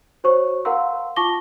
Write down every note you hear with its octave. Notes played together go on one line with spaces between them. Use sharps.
F#4 C5 C#5 C#6
A#4 F5 F#5 A#5 C6 E6
F4 A5 C#6 D6 A#6 G7